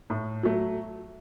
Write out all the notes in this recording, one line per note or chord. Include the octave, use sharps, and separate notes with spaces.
A2
F#3 A3